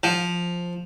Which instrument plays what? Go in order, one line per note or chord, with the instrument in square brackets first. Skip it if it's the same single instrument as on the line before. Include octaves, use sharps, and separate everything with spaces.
[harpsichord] F3